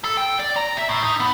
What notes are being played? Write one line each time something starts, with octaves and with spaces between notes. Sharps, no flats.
A4
G5
D5
A#5
E5
A2
D#4
B3